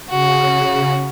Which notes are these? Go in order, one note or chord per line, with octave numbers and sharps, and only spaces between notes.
C#3 F#4